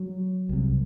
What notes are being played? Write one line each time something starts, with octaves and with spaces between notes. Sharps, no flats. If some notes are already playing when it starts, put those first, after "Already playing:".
Already playing: F#3
C2 C3